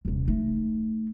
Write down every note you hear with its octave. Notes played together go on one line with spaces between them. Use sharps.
D#1 C2
A3 D#4